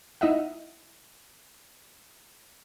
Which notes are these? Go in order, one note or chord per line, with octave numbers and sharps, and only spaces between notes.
D#4 E4 D#5 E5 F#5